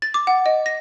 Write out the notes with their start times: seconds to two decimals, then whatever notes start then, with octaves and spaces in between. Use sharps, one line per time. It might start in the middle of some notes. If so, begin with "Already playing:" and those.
0.02 A6
0.14 D6
0.27 F#5
0.46 D#5
0.66 A#6